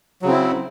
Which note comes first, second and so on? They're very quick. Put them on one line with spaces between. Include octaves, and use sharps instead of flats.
F#3 C#3 C4 E4